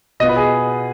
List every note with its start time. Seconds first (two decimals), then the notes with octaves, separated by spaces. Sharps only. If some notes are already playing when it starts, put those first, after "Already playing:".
0.20 B2 B3 F4 D#5
0.29 B4
0.36 G#4